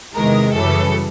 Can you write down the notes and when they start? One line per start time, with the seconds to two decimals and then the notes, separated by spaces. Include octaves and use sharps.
0.13 E2 C3 D#3 G#3 A#4
0.51 F#2 C#3 E3 G3 A4